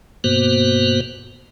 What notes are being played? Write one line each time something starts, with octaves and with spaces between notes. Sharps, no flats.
G2 B2 A#3 B3 F#4 C5